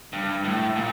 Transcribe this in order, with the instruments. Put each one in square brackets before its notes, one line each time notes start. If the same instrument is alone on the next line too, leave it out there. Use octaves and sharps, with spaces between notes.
[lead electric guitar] G2
A2
A#2